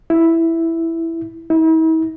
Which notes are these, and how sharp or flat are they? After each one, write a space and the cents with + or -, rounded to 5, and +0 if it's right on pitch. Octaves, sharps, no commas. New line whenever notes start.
E4 +0
E4 -45